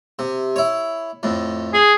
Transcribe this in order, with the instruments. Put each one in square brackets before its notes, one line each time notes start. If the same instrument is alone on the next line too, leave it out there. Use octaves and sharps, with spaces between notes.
[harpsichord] C3
E4 C#5
F2 A2
[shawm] G#4